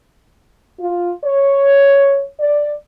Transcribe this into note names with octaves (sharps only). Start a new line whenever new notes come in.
F4
C#5
D5